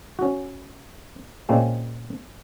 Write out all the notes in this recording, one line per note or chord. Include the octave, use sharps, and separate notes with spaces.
C#4 F#4
A#2 G#3 A#3 C4 C#4